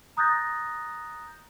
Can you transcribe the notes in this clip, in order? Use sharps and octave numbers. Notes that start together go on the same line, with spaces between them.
A#5 D#6 F#6 G6 A6 A#6